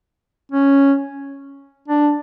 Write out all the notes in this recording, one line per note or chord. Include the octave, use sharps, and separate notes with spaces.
C#4
D4